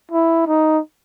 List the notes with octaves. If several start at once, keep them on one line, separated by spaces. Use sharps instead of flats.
E4
D#4